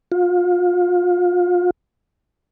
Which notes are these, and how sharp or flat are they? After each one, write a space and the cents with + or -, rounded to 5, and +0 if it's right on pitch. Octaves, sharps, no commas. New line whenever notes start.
F4 +30